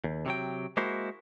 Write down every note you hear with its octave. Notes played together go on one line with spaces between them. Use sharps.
D#2
C3 F#3 G5
G#3 A#3 E4 F#4 C5